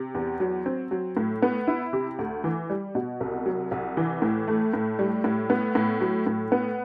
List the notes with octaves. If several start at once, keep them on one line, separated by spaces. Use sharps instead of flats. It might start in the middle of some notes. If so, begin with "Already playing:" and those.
Already playing: C3
E2
F#3
C4
F#3
A2
B3
E4
C3
D2
E3
G3
B2
C2
F#3
C2
E3
A2
A3
A2
G3
A2
B3
A2
F#3
A2
B3